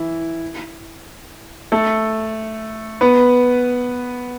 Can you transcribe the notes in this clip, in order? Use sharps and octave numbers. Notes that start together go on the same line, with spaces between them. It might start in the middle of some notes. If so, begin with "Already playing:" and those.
Already playing: E3 E4
A3 A4
B3 B4